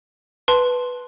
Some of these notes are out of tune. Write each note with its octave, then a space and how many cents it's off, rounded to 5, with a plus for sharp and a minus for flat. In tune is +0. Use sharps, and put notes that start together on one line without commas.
B4 +0 A5 -10 C6 +0